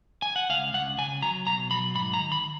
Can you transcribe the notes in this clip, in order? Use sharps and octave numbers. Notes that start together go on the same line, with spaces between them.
G#5
F#5
C#2 F5
C#2 F#5
C#3 G#5
F#3 A#5
B2 A#5
F#3 B5
G#2 B5
A#5
D#3
B5